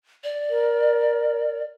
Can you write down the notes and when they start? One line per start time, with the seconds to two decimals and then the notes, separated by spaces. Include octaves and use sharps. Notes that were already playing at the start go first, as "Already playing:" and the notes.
0.24 D5
0.50 A#4